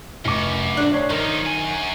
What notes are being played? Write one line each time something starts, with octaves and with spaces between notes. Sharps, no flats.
F1 F#2 D6
D4 C5
D2 C#5 C7
D#3 F3 D#4
F#2 G#5